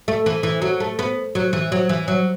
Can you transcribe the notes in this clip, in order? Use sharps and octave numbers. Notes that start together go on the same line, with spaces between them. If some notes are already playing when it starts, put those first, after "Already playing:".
A3
E3
E3
F#3
A3
B3
F#3
E3
F#3
E3
F#3